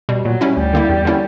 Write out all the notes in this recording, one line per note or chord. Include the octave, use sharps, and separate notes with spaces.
B2 G3
A#2 F#3
G3 C#4 E4
D2 G3
D3 A#3 E4
E2
D3 A#3 C#4 E4